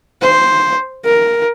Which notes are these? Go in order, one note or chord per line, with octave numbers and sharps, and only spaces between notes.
C5
A#4